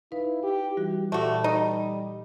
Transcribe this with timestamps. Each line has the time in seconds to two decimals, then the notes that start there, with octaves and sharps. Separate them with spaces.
0.12 D#4 E4 B4 F5
0.43 E4 G4
0.77 E3 G3 F#4 G4
1.12 A#2 G3 A3 F#4 A4 D6
1.44 D#4